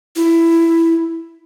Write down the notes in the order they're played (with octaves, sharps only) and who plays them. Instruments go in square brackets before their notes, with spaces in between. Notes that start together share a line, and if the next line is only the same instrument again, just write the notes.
[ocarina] E4